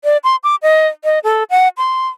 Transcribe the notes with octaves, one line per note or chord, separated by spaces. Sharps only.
D5
C6
D6
D#5
D#5
A4
F#5
C6